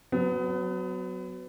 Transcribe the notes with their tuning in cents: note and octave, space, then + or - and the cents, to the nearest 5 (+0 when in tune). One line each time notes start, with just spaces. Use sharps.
F#3 +0 B3 +30